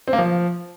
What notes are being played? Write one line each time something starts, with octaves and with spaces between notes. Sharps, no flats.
C4
A#3
F3